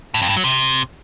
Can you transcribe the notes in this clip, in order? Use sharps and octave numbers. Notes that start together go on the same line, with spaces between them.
A2
F2
G2
F#3
C3